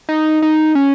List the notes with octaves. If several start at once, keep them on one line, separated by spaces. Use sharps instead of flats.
D#4
D#4
C#4